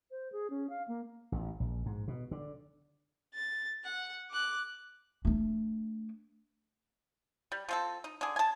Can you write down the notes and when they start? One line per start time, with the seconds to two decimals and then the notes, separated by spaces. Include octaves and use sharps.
0.11 C5
0.32 G#4
0.50 C#4
0.70 F5
0.88 A#3
1.32 A1
1.60 A#1
1.86 G#2
2.08 B2
2.31 D3
3.35 A6
3.85 F#5
4.31 D6 F#6
5.25 A3 D4
7.52 G3
7.69 F3 C4 A4
8.04 D#4
8.21 D3 G#4
8.36 G#5 A5